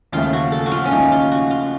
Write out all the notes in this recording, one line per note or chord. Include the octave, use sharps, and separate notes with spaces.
D#2 C#3 F3 A3 F4
F#4
A4
F#4
F4
C#4
D#2 C#3 F3 A3 D#4
F4
F#4
F4